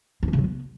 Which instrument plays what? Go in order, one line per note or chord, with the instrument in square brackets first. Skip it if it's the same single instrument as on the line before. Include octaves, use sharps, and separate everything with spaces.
[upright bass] C4
C#4
C#3
F#3
B3